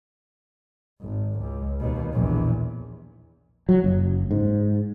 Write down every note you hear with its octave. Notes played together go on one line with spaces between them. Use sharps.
G#1
C#2
D#2 B2
A#1 E2
F#3
F#1
G#2